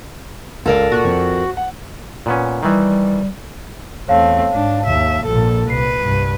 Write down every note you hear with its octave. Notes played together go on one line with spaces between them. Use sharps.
C#2 A4 A#4 D5 F5
A#2 F#4
F2
F#5
A#2 B3 C#4
D#3 E3 G3
E2 A3 C4 C#5 F5 A5
G#2 D4
D#2 E5
A#1 A#2 A4
C2 B4 C7
C2 G2